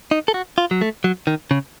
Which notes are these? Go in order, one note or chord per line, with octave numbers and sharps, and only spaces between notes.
D#4
A4
F#4
F4
F#3
A3
F#3
D#3
C#3